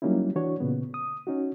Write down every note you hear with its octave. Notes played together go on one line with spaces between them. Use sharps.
F#3 G3 A#3 C#4 D#4 E4
E3 D4 F#4 C#5
A#2 C#3 B3
D#6
C#4 D#4 F#4